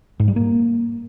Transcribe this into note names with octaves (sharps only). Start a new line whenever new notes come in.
G#2
G3
A#3